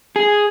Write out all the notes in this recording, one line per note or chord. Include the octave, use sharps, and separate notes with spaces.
G#4